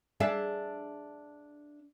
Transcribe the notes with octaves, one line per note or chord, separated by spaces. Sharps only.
D4 G#4 E5